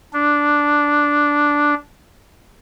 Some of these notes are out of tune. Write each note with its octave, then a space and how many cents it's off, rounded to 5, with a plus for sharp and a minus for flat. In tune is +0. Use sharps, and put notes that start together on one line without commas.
D4 -5